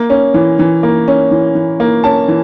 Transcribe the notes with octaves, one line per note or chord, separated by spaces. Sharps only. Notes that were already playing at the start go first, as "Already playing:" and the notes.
Already playing: A#3
C#4
E3
E3
A#3
C#4
E3
E3
A#3
C#4 A5
E3